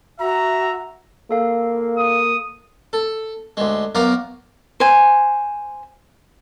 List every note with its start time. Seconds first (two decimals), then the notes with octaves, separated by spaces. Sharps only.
0.20 F#4 E5 A#5
1.31 A#3 A4 F5
1.98 D#6
2.93 A4
3.57 D2 G#3
3.95 F#2 B3 A#4 F5 A#5 D6
4.80 C5 G#5